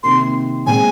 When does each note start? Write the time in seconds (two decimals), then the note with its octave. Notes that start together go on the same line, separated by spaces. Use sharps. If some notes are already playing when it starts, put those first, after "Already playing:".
0.03 C3 D#3 A#3 C6
0.66 A#2 G#3 C4 G#5